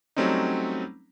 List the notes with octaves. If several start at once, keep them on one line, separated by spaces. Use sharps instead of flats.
F#3 G3 A3 C4 C#4 D#4